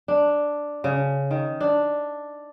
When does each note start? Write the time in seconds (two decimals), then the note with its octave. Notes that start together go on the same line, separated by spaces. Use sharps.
0.08 D4
0.84 C#3
1.31 D#3
1.60 D4